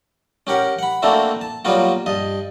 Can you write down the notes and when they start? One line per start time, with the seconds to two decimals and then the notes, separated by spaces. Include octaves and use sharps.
0.47 C#4 G4 A#4 F#5
0.79 F#5 B5
1.02 A3 A#3 C4 D4 E4 F#4
1.41 A5
1.65 F#3 G3 A#3 B3 F4 F#4
2.06 G2 D#5